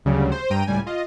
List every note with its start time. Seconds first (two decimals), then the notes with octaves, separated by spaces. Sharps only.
0.05 D2 C#3 F#3 G3
0.32 C5
0.50 G2 G5 A#5 D#7
0.67 C#2 A2 G3 G#5
0.86 F4 D#5